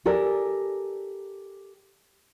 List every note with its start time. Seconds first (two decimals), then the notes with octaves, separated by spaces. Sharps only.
0.05 G4 A4 A#4 D5 G#5